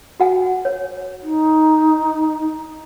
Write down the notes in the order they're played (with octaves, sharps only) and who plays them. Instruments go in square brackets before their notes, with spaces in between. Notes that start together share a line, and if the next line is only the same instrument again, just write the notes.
[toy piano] F#4 F#5 G#5
C#5
[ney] D#4